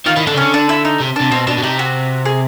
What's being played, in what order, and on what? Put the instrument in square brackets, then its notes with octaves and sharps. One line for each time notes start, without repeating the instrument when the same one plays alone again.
[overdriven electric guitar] D#3 [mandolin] F4
[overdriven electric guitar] D#3 [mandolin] E4
[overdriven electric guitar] D3 [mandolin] D4
[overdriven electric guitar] C#3
[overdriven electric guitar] D3 [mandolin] C#4
[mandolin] D4
E4
D#4
[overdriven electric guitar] C3
[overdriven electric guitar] C3 [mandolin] D4
[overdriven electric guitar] B2 [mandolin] C4
[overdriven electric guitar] B2 [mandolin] D4
[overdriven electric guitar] B2
[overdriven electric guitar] C3 [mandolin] D#4
[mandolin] F#4
G#4